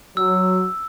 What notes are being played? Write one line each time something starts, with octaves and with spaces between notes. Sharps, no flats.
F#3 E6